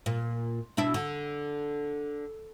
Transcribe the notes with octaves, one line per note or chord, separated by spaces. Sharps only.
A#2
B2 D4 E4
D3